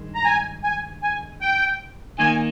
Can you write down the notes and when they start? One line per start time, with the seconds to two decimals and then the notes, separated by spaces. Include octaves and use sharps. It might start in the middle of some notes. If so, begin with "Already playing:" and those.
Already playing: G2 D#3 G#3
0.15 A#5
0.25 G#5
0.64 G#5
1.02 G#5
1.41 G5
2.19 D#3 A#3 D#4 G#5